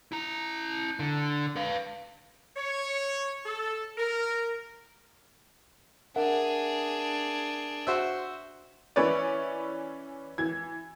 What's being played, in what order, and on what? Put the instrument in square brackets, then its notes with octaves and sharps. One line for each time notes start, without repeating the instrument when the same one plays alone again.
[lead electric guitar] E4 A#5
D3
B4 F5
[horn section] C#5
A4
A#4
[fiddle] D4 G#4 [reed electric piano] A#4 E5 F#5
[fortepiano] F#4 C5 E5
[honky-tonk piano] E3 C#4 E4 B4 C#5 D5
E3 G#6